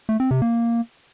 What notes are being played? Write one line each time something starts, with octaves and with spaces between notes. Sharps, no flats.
A3
C4
C3
A#3